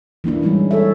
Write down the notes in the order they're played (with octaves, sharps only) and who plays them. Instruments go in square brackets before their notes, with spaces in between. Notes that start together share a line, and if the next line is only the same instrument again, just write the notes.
[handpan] E3 A#3 D4 E4
G3 G#3 A#3 C#4 D#4
A4 C#5 E5